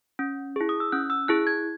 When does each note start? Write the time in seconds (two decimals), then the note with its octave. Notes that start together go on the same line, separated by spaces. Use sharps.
0.19 C#4
0.56 E4 G#4
0.69 D#6
0.80 E6
0.92 C#4 F#6
1.10 E6
1.28 E4 G#4 F#6
1.47 G#6